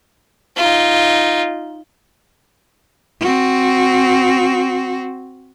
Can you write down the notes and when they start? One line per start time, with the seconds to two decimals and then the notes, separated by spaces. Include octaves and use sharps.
0.57 D#4 F4
3.21 C4 F#4